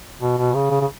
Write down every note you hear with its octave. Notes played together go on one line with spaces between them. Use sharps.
B2
B2
C#3
C#3
C#3